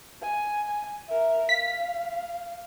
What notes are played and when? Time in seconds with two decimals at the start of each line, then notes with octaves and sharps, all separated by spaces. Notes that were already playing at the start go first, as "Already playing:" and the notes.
0.22 G#5
1.08 A#4 E5
1.49 F5 B6